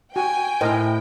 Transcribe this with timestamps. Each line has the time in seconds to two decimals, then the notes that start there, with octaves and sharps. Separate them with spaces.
0.16 F#4 G5 G#5
0.61 A2 E4 A#4 C5 D#5